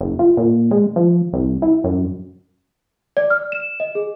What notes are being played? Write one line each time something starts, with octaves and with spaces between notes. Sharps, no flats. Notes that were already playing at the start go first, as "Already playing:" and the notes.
F#1
F4
A#2
G#3
F3
C2
E4
F#2
D5
F6
E7
D#5
G#4